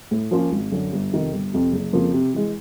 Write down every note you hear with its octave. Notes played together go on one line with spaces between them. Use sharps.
A2
F3 A#3 C#4 F4
G#1
F#2 D3
G1
F2 C3 D#3
G1
F2 C3
F#1
F2 C#3 F3 A#3
C3
E3 G#3